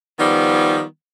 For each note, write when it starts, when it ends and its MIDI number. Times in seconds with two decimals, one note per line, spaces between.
0.20 0.83 51
0.20 0.83 53
0.20 0.83 55
0.20 0.83 59